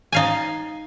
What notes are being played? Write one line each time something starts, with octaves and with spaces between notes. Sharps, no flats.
D#4 F5 G#5